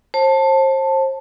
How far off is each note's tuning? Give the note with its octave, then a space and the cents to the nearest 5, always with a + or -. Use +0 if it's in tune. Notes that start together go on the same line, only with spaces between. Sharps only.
C5 +35 A5 +5